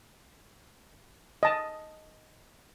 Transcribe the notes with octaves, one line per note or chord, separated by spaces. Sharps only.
D#5 A5